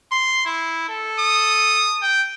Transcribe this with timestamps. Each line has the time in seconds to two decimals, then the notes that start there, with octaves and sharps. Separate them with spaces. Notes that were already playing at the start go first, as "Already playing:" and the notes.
0.12 C6
0.46 E4
0.89 A4
1.18 D#6
2.02 G5